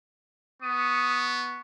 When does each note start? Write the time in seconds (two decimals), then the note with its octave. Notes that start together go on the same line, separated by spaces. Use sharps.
0.62 B3 C#6 D#6